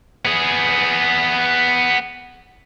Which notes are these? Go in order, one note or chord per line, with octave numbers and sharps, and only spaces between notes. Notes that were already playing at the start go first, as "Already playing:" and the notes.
B3 G#4